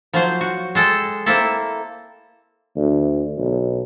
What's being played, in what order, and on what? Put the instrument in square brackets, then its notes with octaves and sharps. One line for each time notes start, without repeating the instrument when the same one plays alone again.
[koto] F3 F#3 C5
F#4
G#3 A4 G5
A#3 C4 E4 A4
[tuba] D2
B1